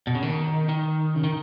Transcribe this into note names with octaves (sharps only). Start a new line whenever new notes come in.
B2
C#3
D#3
D#3
C#3
D#3